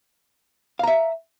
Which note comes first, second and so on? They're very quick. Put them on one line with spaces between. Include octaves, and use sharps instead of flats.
F5 A#5 E5